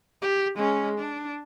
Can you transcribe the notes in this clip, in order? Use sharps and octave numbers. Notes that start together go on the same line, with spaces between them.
G4
G#3 C#4
D4